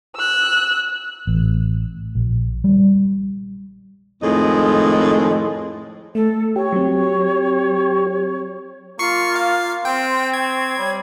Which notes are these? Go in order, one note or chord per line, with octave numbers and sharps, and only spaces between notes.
E6 F#6
A1
A#1
G3
F2 A2 D#3 G#3 D#5
A3 A4
G4 C#5
F#3 C4
A#3 F4 C#6 C7 C#7
F5
C4 G5 C6
C#6 G#6
G3 C#5